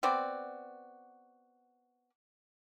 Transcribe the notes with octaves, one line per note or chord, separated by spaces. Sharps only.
B3 C4 F#4 D5